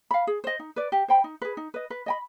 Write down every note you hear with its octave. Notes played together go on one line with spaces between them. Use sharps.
F5 B5
G#4
C5 D#5
D#4
B4 D5
G4
C5 G5 B5
D#4
G#4 B4
D#4
B4 D#5
B4
D#5 G5 B5